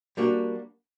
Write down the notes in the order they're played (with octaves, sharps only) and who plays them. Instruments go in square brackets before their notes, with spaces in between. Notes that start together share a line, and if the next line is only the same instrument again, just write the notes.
[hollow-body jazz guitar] G3 A#3 D4 F#4